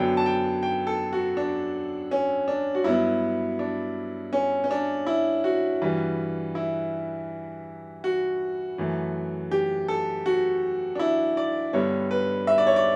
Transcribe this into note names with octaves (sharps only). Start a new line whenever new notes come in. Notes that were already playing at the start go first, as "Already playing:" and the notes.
Already playing: F#2 D3 F#3 B3 G5
A5
G5
G5
A4
F#4
D4
C#4
D4
F#4
G2 F#3 B3 E4
D4
C#4
C#4
D4
E4
F#4
G2 E3 G3
E4
F#4
F#2 E3 A3
G4
A4
F#4
D4
E4
D5
G2 D3 G3 B3 C#5
B4
E5
D5
C#5
D5